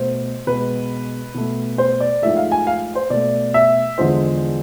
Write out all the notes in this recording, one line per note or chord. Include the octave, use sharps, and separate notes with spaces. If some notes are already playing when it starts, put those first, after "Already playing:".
Already playing: B2 A3 C5
B2 G#3 B4
B2 A3
C5
D5
G#2 F3 A3 E5
F5
G#5
F5
C5
B2 A3 D5
E5
E2 D3 F3 G#3 C5